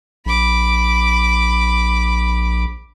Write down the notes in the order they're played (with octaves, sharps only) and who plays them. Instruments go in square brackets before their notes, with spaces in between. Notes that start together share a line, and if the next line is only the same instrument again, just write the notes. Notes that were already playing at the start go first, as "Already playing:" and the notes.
[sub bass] A#1 [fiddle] B5 D6